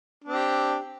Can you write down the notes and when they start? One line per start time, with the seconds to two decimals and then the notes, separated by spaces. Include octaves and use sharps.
0.24 D4
0.29 C4
0.33 G4